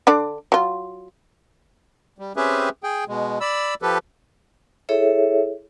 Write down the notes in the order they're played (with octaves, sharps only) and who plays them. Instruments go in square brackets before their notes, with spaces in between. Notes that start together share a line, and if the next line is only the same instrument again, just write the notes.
[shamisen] D3 D4 D5
F#3 F4
[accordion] G3
C4 C#4 G4 G#4 B4 E5
G#4 G5
B2 G#3
D5 B5 E6
F3 G4 A4 B4
[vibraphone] E4 G#4 A4 C#5 E5